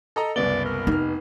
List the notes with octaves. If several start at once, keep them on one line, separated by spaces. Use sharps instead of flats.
A4 D#5 A#5
F#1 C2 B3 D5 G7
A#4
F1 D#4 F6